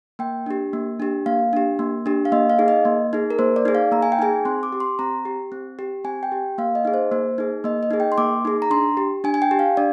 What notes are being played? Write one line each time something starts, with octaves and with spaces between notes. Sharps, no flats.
A#3 G5
D4 G4
A#3
D4 G4
A#3 F5
D4 G4
A#3
D4 G4
F5
A#3 D#5
F5
D#4 G#4
D#5
A#3
D#4 G#4
A#4
A#3 C5
D5
D#4 G#4
F5
A#3 A#5
G#5
G5
D#4 G#4 G#5
C4 C6
D6
G4
C6
C4 A#5
G4
C4
G4
C4 G#5
G5
G4
A#3 F5
D#5
D#4 G#4
C5
A#3 C5
D#4 G#4
A#3 D#5
D#5
D#4 G#4
G5
C6
A#3 D6
D#4 G#4
A#5
D4 C6
G4
D4 G#5
G#5
G5
G4
F5
D4 D5